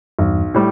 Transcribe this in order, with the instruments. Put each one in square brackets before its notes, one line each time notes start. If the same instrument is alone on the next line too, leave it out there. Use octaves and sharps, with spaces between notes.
[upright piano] B1 [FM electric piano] E2 G2
[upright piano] A2 G3